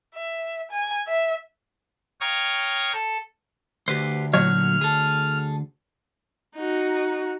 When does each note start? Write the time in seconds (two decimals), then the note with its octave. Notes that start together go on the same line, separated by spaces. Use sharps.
0.14 E5
0.71 G#5
1.08 E5
2.21 C#5 F5 G5 A#5 C#6 D#6
2.93 A4
3.88 D2 G4 B4 C5
4.33 A#2 D3 F#3 C#5 F6
4.81 G#4 A4
6.56 D#4 F#4